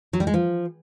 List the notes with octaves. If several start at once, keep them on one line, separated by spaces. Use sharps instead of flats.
F#3
G3
G#3
F3